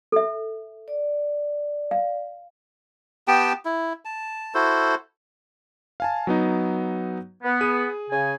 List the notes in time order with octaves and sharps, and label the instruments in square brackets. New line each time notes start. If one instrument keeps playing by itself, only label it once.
[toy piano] A4 E5
[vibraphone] D5
[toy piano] F5
[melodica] B3 G4 G5 A5
E4
A5
E4 F#4 A4 C5
[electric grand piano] F5 G#5 A5
F#3 B3 D#4
[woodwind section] B3
[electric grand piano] G#4 D#7
[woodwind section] C#3 G#5